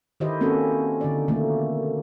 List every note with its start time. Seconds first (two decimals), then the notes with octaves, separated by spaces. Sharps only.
0.20 D#3 D#4 E4 G4 C5 D#5
0.41 A#3 C4 C#4 F#4 A4
1.01 D3 D#4 D5
1.28 B2 D#3 F3 A3 A#3